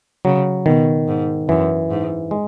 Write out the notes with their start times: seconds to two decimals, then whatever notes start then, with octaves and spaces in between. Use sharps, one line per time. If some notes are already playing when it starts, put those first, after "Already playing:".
0.25 C#3 F#3
0.66 B2 D#3
1.08 G#2
1.49 F#2 E3
1.91 G#2
2.31 G#3